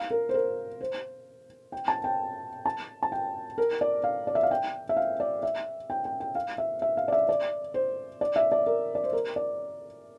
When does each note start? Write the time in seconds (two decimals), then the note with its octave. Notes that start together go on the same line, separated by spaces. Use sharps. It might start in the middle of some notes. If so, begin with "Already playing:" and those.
Already playing: F5
0.11 A#4
0.29 C5
0.34 A#4
0.81 C5
1.72 G5
1.88 A5
2.04 G5
2.66 A5
3.03 A5
3.12 G5
3.58 A#4
3.81 D5
4.04 F5
4.27 D5
4.35 E5
4.43 F5
4.51 G5
4.89 E5
4.97 F5
5.20 D5
5.43 E5
5.90 G5
6.05 G5
6.20 G5
6.35 F5
6.58 E5
6.82 E5
6.97 F5
7.08 D5
7.12 E5
7.29 D5
7.74 C5
8.21 D5
8.36 E5
8.52 D5
8.66 A#4
8.95 D5
9.04 C5
9.13 A#4
9.36 D5